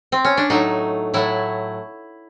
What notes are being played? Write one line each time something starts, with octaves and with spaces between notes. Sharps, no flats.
C4
C#4
D4
A2 F#3 A3 D#4
A2 F#3 A3 E4